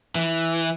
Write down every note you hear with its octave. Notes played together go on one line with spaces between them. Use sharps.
E3